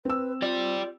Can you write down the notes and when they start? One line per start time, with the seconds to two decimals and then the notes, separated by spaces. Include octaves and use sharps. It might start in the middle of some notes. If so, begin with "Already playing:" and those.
0.05 C4 B4 E6
0.42 F4 G4 D5